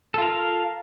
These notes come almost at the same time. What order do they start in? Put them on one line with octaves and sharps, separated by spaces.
A4 F4 A#4 F5